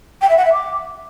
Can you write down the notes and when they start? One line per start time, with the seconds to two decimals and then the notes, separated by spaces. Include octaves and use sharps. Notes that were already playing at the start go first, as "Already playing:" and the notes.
0.21 G5
0.29 E5
0.37 F#5
0.45 E5
0.52 D6